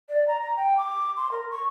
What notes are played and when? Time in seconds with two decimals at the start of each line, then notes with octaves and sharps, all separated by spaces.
0.09 D5
0.28 A#5
0.41 A#5
0.56 G5
0.77 D6
1.17 C6
1.32 A#4
1.51 C#6